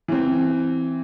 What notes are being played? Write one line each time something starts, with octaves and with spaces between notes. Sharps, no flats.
E3 C4